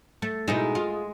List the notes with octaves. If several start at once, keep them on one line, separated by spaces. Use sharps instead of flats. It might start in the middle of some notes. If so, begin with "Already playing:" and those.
A3
B2 G#3 D#4 E4
F4